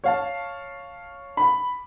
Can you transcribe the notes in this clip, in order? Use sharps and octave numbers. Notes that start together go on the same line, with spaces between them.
C#5 F5 A5
B5